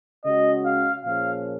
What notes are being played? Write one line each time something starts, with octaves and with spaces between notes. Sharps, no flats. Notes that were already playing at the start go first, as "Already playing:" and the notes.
C#3 G#3 C#4 F#4 D#5
F5
A#2 F3 A#3 C#4 G#4 F5